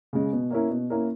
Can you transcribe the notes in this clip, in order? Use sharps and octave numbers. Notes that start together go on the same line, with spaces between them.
C#3 G#3
B2
A#3 C#4 E4 A#4
B2
A#3 C#4 E4 A#4